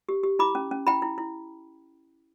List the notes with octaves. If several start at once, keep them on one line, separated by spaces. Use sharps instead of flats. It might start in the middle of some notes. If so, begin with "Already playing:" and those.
G4
G4
E4 B5 D6
C#4
C#4
E4 G5 B5
E4
E4